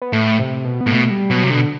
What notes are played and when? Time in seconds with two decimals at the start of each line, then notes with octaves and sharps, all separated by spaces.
0.02 B3
0.13 A2 A3
0.39 C3
0.64 B2
0.81 B3
0.86 A2
0.91 B2 A3
1.11 G3
1.30 B2 F#3
1.43 C3
1.50 B2 D3